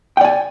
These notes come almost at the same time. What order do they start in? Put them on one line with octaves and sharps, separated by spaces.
G5 D5 G#5